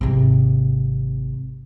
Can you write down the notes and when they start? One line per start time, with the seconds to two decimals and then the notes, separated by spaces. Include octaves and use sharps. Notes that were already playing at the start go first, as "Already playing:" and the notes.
0.01 G#1 C3